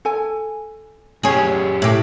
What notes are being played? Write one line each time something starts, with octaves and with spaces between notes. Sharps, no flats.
A4 G#5
F#2 C#4 G4 G#4 C#5
A2 G4 A4 C#5